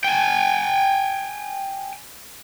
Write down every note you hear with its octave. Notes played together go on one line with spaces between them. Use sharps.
G5 G#5